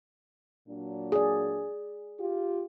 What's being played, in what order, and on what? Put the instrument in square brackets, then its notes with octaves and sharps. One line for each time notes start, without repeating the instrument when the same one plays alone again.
[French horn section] A#2 F#3 D4
[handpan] G#4 D5
[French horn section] F4 G4